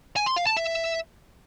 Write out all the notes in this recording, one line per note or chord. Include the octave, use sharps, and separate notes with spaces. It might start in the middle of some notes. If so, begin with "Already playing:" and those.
G#5
C6
F5
A5
E5